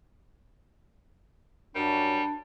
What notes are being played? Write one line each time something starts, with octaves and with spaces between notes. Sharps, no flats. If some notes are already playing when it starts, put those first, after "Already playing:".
F#2 G3 D4